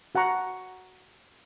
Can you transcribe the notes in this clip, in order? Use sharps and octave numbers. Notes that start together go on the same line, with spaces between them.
F#4 F#5 A5 A#5 C#6